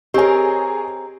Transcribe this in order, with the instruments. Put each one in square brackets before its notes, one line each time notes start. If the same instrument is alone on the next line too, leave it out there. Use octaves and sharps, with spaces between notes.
[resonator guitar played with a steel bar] C4 A#4 [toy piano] G4 [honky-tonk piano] G#4 C#5 D#5